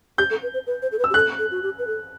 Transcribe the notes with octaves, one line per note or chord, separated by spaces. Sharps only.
G4 G6
A4
B4
C5
B4
C5
A4
B4
E6
G4
A4 F#6
A4
F#4
G4
B4
A4